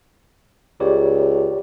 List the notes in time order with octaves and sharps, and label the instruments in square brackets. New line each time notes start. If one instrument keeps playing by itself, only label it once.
[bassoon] C#2 [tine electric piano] G4 C#5 D5